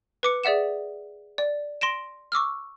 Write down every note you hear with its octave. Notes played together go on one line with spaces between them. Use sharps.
B4 D6 C#7
G#4 D5 E5 F#5 E7
D5
C6 A#6 D7 E7
C#6 D6 E6 F6